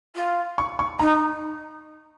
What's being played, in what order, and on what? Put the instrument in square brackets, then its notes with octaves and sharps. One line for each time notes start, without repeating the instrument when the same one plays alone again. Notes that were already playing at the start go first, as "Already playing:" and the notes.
[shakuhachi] F4
[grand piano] C#6
C#6
[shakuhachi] D#4 [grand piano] A#5